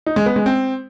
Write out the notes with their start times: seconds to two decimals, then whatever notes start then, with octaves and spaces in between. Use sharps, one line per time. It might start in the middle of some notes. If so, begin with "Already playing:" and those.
0.06 D#4
0.16 G#3
0.26 B3
0.36 G#3
0.46 C4